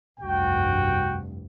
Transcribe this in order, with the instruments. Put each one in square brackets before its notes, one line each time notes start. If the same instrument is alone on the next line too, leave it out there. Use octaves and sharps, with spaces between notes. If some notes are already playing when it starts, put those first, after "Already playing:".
[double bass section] F1 C2 G2 [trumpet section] F#4 G5